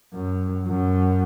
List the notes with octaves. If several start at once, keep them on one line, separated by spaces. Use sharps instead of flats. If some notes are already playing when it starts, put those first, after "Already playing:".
F#2
F#2